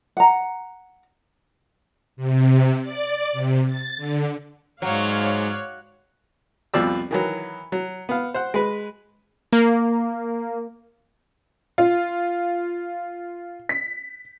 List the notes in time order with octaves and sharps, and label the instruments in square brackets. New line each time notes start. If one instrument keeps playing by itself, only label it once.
[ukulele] F#5 A#5
[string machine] C3
D5
C3
A6
D3
[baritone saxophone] G#2 [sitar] F#3 [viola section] C#5 D5 F5
[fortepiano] C2 F2 B2 F3 D5 E6
D#3 E3 F#3
F#3
B3 F5
C5 F#5
G#3 B4
[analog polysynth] A#3
[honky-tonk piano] F4
B6